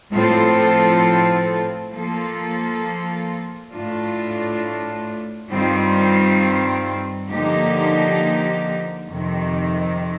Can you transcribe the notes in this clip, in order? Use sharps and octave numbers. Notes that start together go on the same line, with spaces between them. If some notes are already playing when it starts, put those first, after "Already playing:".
A2 F3 C4 F4 A4
F3 A#3 F4 A4
A2 A3 D4 F4
G2 D#3 G3 C4 F4
D3 F3 A#3 D#4 G4
F2 C3 D#3